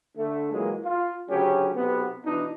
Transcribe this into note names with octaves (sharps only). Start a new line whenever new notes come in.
D3 A3
A#2 E3 F#3 G#3
F4
D2 C#3 F#3 C#4 G4
B1 C3 B3
B2 E3 D4 D#4